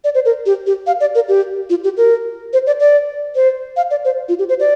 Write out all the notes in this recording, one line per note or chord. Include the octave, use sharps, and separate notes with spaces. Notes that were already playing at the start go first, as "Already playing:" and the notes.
D5
C5
A#4
G4
G4
F5
D5
A#4
G4
F4
G4
A#4
C5
D5
D5
C5
F5
D5
C5
F4
G4
C5
D5